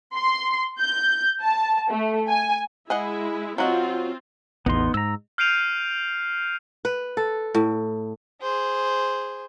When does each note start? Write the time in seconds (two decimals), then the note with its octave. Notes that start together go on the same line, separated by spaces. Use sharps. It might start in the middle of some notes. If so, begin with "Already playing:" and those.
0.15 C6
0.80 G6
1.41 A5
1.90 A3
2.28 G#5
2.90 G#3 E4 G#4 D#5 F#5
3.58 F#3 C4 F4 F#4 D#5
4.66 A1 E2 B3 D#4 C6
4.94 G#2 A#5 E6
5.38 F6 G6 C7 D7 D#7 F7
6.85 B4
7.17 A4
7.55 A2
8.42 G#4 C5